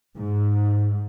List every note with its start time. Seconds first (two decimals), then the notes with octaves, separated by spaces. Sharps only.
0.15 G#2